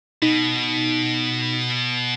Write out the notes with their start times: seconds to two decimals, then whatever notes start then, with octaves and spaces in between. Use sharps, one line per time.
0.22 B2 D#4